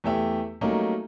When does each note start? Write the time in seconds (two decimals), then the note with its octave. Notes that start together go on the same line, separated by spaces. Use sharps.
0.04 E2 A3 G4 E5
0.61 F#3 G3 A3 A#3 C#4 D#4